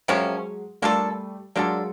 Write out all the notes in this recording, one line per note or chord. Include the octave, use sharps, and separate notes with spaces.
C3 F3 F#3 G#3 A#3 C#4
G3 A3 A#3 D4 F4 A4
F#3 G#3 A#3 D4 F4 A4